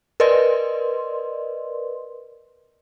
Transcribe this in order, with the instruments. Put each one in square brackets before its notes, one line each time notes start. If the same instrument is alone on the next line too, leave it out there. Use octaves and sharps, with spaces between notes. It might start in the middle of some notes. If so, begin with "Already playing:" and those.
[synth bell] A#4 B4 D5 D#5 C6